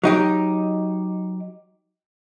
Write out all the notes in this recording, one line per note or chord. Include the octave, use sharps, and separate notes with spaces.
F#3 D#4 G4